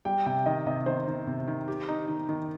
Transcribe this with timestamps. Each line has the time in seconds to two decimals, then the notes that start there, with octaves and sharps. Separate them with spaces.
0.05 G3 G5
0.26 C3 G5
0.46 D#3 D#5
0.67 C3 D#5
0.86 D#3 C5
1.07 D#3
1.27 C3
1.48 D#3
1.68 G4
1.89 D#4
2.08 D#3
2.29 D#3